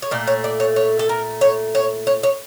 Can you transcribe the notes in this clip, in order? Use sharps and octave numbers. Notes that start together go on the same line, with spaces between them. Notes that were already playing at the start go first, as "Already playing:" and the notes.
C#5
A#2 A3 D5
C#5
D5
C#5
C#5
A4
A#4
C#5
C#5
C#5
C#5